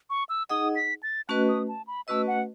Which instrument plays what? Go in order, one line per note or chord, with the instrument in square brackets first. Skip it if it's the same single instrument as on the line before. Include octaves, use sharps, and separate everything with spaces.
[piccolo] C#6
E6
[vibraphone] D#4 G#4 D#5 F#5 [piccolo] D#6
[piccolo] B6
A6
[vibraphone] A3 C#4 F#4 B4 D#5 [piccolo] F#6
[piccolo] D#6
A5
B5
[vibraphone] A3 C#4 F#4 B4 D#5 [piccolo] E6
[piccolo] F#5